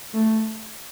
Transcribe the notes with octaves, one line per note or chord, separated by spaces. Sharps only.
A3